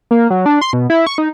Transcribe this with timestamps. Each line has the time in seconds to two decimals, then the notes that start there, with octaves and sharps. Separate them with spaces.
0.11 A#3
0.30 F#3
0.46 D4
0.61 C6
0.73 B2
0.90 E4
1.07 C#6
1.18 D#4